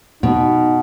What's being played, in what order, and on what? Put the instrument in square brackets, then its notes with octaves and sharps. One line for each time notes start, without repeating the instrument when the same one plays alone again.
[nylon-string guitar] B2 [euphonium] D#4